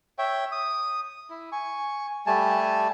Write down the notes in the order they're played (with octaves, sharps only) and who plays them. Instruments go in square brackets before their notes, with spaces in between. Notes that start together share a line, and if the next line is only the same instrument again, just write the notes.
[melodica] C#5 E5 G5
D#6
E4
G#5 C#6
G3 A3 G#5 A5